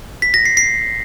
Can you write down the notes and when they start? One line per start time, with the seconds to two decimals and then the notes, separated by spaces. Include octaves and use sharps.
0.22 B6
0.34 A#6
0.45 C7
0.57 C7